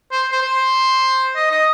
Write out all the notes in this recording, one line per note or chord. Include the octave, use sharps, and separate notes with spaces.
C5
C5
C5
D#5
D#5